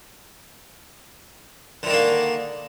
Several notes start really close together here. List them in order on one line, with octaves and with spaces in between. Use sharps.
D3 D#3 D4 A#3